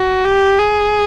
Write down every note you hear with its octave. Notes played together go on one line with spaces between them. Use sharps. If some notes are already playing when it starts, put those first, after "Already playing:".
Already playing: F#4
G4
G#4